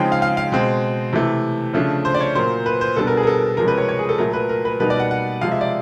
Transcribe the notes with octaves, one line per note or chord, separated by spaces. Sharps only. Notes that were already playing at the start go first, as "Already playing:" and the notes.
Already playing: C#3 F3 G#3 C4 D#4 G5
F5
F5
F5
B2 G#3 C4
C3 E3 A3
C#3 F3 A3 D4
C5
D5
C#5
A#2 F#3 A#3 C5
B4
C5
B2 G3 B3 D4 A4
A#4
G#4
A#4
A4
A#4
C3 F3 G#3 C#4 A#4
B4
C#5
C#5
G#4
A4
A#2 F#3 A3 A#4
B4
A#4
B4
B2 G3 A#3 D#4 B4
D5
F#5
F#5
C3 F3 G#3 F5
E5
D5